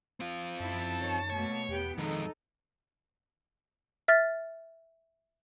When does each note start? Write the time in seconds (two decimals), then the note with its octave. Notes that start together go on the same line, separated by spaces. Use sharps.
0.20 C4 F4
0.60 F#2 E4 A5
0.99 D#3 C#5
1.30 B2 A3 A#3 C#5
1.69 E2 B3 G4 G5
1.98 F2 D#3 G#3 D#4 A4
4.08 E5 F6 A6